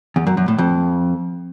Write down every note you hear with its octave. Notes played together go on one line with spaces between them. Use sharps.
E2
F#2
F#2
A2
F2